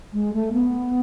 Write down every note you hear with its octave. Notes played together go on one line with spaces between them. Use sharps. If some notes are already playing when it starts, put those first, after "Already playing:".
G#3
A3
B3